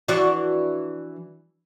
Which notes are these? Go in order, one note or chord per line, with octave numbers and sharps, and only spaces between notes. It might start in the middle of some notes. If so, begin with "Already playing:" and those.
E3 D4 F#4